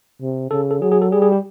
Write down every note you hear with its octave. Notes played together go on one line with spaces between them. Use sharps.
C3
C#3 A4
A4
F#3 G#4
G#4
A4
G3 G#4
G#4
G4